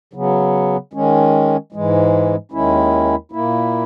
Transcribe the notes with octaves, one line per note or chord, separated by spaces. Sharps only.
C#3 F#3 B3
D#3 G#3 C#4
G#2 E3 G#3
D#2 D#3 G#3 C#4 E4
A#2 A#3 E4